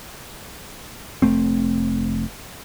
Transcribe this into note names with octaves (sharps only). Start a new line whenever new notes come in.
F1 G#2 A3 C4